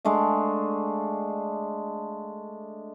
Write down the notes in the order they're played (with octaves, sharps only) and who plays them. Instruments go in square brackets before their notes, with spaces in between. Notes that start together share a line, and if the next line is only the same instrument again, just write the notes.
[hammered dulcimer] G#3 A3 D4 F5